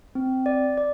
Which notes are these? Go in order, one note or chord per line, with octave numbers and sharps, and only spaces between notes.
C4
D5
D5